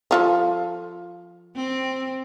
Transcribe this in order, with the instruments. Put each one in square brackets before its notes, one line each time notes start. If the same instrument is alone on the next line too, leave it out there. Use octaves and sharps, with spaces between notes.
[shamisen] F3 F4 A4
[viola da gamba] C4